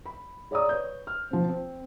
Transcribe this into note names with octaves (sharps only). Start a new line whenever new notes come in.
B5
G#4 C#5 D5 A#5 D#6
B4 C#5 G6
F6
F3 C4
C4